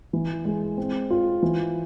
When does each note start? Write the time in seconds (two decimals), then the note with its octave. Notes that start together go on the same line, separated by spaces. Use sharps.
0.13 E3
0.45 G#3
0.77 C4
1.10 F4
1.42 E3